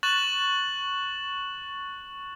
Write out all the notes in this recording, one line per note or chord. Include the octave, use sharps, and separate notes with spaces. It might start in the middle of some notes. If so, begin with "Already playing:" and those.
C#6 F#6 A6 E7 F#7